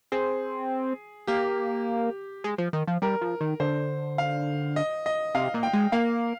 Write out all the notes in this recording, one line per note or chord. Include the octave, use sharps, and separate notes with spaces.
C4 G#4
A#3 G4
G#3
F3
D#3
F3
G3 A#4
F3
D#3
D3 C5
F5
D#5
D#5
C3 F5
A#2
G5
G#3
A#3 F5